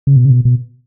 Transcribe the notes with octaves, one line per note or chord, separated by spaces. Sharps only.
C#3
B2
C#3
B2
B2